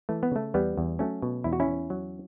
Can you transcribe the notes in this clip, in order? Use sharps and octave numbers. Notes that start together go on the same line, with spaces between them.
E3 A3
B3
C#3 A3
E2 G3 B3
E2
F#3 A3 C#4
B2
E2 E4
F#4
C#4 E4
E2
F#3